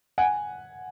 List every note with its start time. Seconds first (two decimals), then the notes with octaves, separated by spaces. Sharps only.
0.18 F#5 G#5